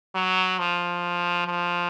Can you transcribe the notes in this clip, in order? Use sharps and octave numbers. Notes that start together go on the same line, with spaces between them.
F#3
F3
F3